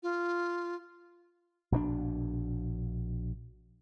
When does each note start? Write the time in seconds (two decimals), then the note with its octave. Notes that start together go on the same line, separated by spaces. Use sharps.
0.03 F4
1.72 A#1 B2 F3 D4